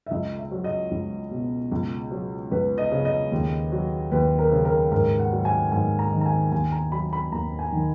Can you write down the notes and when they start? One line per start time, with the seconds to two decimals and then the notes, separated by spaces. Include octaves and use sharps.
0.07 E5
0.11 C#2 D#5
0.38 E5
0.52 F#3
0.64 D#5
0.91 C#2
1.31 B2
1.72 C#2
2.11 F#3
2.52 C#2 B4
2.78 D#5
2.92 C#3
3.05 D#5
3.32 D#2
3.72 F#3
4.12 D#2 B4
4.39 A#4
4.52 C#3
4.65 A#4
4.92 G#2 A#4
5.19 F#5
5.32 F#3
5.45 G#5
5.72 G#2 G#5
5.99 A#5
6.13 D#3
6.21 A#5
6.26 G#5
6.52 D#2 G#5
6.72 A#5
6.92 F#3 B5
7.13 B5
7.32 D#2 A#5
7.59 G#5
7.72 D#3